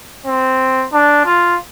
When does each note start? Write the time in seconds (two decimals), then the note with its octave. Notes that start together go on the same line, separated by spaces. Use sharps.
0.26 C4
0.93 D4
1.25 F4